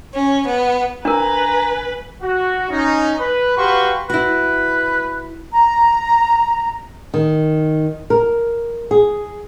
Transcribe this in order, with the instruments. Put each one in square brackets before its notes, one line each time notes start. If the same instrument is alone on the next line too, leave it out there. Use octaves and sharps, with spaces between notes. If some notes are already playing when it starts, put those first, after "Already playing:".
[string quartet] C#4
B3
[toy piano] D4 A#4 [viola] B4 [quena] G#5 [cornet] A#5
[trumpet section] F#4
C#4 D#4
B4
F#4 G4 B4 F5 C6 C#6
[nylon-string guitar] E4 F#4 [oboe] B4
[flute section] A#5
[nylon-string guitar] D#3
A#4
G#4